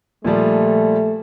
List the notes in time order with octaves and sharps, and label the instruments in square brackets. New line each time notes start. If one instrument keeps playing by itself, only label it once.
[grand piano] A#2 F3 G3 [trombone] A3